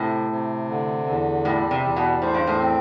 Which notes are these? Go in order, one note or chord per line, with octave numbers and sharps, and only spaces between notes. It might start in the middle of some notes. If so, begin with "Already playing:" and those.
Already playing: A2 C3
C3
D3
E2
A2 G3
C3
E2
B2
A2 C5
G2
A2
C4